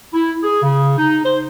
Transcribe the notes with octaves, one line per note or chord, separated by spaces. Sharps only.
E4
G#4
C#3
D#4
C5